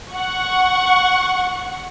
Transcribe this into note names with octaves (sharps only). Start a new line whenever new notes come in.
F#5 C#6